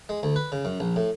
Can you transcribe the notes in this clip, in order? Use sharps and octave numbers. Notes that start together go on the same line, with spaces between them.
G#3
D2
B4
C#3
F#2
A#1
A2